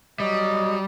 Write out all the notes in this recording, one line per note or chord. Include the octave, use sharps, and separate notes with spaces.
F#3 G3 D#5